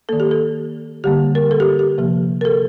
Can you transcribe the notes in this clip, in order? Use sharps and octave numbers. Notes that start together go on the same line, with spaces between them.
D#3 A#3 A4
G4
A4
D3 G3 A#3 G4
A#4
A4
G4
G4
C3 F3 A#3
A#4
A4